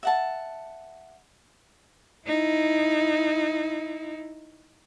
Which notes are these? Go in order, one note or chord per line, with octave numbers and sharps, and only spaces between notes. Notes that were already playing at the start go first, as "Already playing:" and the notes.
E5 F#5 A5
D#4 E4